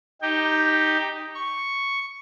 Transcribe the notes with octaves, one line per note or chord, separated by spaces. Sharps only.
D#4 G4 G5
C#6